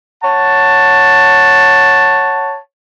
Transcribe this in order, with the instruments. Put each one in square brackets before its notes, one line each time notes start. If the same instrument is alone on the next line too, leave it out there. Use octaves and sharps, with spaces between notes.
[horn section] C#5 F#5 A5